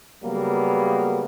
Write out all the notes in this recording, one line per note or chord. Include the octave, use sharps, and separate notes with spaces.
C#3 F#3 G3 A#3 B3